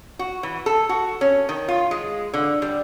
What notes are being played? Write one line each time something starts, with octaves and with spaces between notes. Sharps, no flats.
F#4
E3
A4
F#4
C#4
D#3
F4
G#3
D3
G3